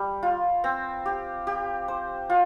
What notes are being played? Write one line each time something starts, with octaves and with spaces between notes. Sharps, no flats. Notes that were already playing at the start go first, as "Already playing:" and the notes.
Already playing: G3
F4
C4
G4
G4
C5
F4